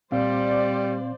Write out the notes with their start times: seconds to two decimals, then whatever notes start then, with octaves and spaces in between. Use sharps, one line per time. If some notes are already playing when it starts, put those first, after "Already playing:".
0.12 A#2 G3 C4 C5 D5 F5